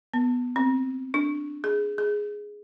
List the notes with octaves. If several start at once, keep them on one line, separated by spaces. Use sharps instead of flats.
B3
C4
D4
G#4
G#4